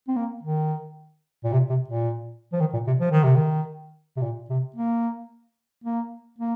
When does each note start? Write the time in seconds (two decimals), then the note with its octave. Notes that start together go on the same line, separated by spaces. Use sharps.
0.08 C4
0.16 A#3
0.43 D#3
1.44 A#2
1.53 C3
1.70 C3
1.88 A#2
2.53 F3
2.60 D#3
2.74 A#2
2.87 C3
3.00 F3
3.12 D#3
3.24 C3
3.36 D#3
4.17 C3
4.22 A#2
4.50 C3
4.76 A#3
5.84 A#3
6.39 A#3